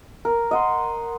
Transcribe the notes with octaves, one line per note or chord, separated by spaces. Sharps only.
A#4
D#5 F#5 C6